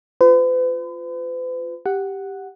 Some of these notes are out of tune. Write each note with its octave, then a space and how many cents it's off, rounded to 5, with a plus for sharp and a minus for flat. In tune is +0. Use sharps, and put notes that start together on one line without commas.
F4 +0 B4 +45
G4 +0 F#5 +0